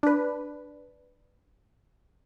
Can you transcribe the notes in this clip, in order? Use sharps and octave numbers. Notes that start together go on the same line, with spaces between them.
D4 B4